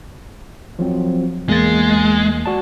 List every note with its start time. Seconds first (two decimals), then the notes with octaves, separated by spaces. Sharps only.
0.79 F3 F#3 C4
1.49 E2 G#3 A#3 A6
2.46 F#4 D5 A5